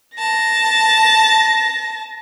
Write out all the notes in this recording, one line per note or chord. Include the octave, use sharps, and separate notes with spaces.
A5 A#6